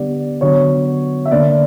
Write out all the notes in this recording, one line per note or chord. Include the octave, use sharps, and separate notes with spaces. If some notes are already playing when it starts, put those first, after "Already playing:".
Already playing: D3 G3 B3 D5
D3 F#3 B3 C#5
E5
D3 A#3 D5